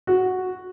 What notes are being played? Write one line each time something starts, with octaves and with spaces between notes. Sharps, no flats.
F#4